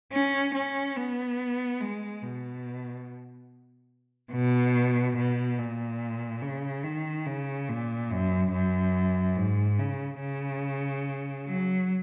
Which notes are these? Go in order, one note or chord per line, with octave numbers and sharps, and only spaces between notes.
C#4
C#4
B3
G#3
B2
B2
B2
A#2
C#3
D#3
C#3
A#2
F#2
F#2
G#2
C#3
C#3
F#3